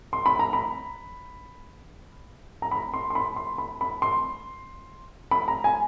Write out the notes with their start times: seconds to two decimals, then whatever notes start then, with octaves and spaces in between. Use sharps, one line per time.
0.13 C6
0.26 B5
0.39 A#5
0.53 B5
2.62 A#5
2.71 B5
2.94 C6
3.10 C6
3.15 B5
3.36 C6
3.58 B5
3.81 B5
4.02 C6
5.31 B5
5.48 A#5
5.64 G#5